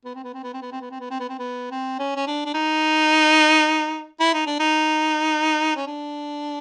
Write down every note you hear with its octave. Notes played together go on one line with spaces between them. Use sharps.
B3
C4
B3
C4
B3
C4
B3
C4
B3
C4
B3
C4
B3
C4
B3
C4
C#4
C#4
D4
D4
D#4
E4
D#4
D4
D#4
C#4
D4